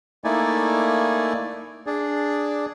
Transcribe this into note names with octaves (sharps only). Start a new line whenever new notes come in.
A3 A#3 D#4 E4 D5 G#5
D4 G#4 D5